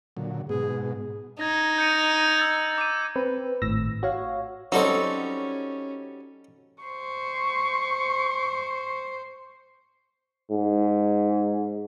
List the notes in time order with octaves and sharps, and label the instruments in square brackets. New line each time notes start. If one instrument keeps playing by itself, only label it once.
[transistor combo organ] A#2 D3 F#3
[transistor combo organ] G#2 B2 [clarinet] G#4
[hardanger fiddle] D#4 [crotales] G#6 A#6
[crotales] G6 C#7 D#7
E6 A6
D6 D#7
[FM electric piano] C4 B4
G#1 A2 E6 A#6
F#4 C#5 F5
[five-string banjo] F#3 G3 C4 [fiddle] C#4 [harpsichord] D#4 A4 A5
[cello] C5 [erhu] C#6
[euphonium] G#2